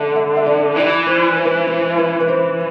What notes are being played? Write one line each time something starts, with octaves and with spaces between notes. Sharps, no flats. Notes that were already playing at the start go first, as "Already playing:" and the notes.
Already playing: D3 E5
E5
E5
D5
E3 D5
C5
C5
B4
C5
C5
B4
B4
C5